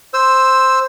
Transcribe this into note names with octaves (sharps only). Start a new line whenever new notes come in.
C5 E6